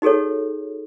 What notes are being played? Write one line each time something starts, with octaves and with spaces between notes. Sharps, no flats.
D#4 F#4 G#4 A4 C#5